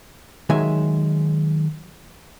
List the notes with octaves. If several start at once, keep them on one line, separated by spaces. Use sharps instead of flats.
D#3 F#3 G#3 E5 G#5